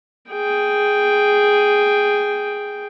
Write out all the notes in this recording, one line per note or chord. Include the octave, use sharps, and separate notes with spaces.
G#4 G5